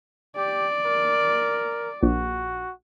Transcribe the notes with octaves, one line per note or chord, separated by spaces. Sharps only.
G4 D5
A#4
A#1 F#4